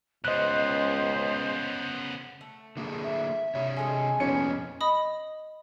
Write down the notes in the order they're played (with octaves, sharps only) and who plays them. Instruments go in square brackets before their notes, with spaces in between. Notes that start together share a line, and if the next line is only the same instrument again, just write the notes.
[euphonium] C#2 [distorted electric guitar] C#3 B3 [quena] C5 [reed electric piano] D#5 F#6
[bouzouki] A3
[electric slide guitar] D3 A#3 G#4
[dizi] E5
[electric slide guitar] C3 C#5
[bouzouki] G#3 A4 D#5 [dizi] G#5
[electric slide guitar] F2 A#2 B3 [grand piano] C#4 C#7
[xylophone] D#5 B5 D#6